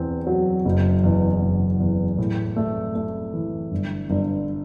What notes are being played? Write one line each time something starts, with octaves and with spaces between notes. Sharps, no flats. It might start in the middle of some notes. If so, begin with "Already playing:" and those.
Already playing: E2 C4
F#3
F#1
E2
F#1
E2
A2
A3
A3
E3
G1
G1